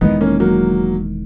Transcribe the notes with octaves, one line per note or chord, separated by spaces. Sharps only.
E1 E2 D#3 G#3 B3 D#4
A#3 C#4
F#3 A#3